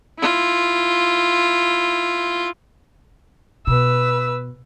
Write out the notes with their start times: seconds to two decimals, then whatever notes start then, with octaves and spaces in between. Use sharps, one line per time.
0.19 E4 F4
3.67 B2 B4 E6